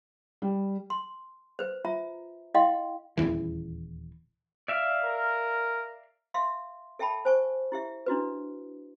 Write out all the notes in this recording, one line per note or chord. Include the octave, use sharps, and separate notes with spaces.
G3
C6
B4 C5
F4 E5 A#5
E4 D#5 F5 G5 C6
D#1 A#1 E2 E3
D5 E5 F5
A#4
E5 F5 C6
A4 E5 G5 A5 B5
C5 G#5 C#6
E4 G4 E5
D4 E4 F#4 B4